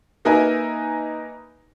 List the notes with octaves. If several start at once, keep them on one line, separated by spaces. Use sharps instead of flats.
A#3 D#4 A#4 B4 E5 G#5